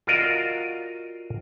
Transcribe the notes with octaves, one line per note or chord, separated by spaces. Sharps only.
F4 F#4 A#4 D5 D#5 F5